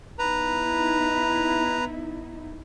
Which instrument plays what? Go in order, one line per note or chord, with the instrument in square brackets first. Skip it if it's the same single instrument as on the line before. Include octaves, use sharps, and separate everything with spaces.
[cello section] B3 D#4 E4 [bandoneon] B4 A#5